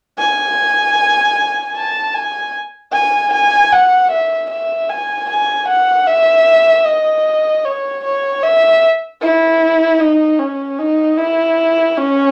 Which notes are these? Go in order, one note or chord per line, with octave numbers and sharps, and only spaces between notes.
G#5
A5
G#5
G#5
G#5
F#5
E5
E5
G#5
G#5
F#5
E5
D#5
C#5
C#5
E5
E4
D#4
C#4
D#4
E4
C#4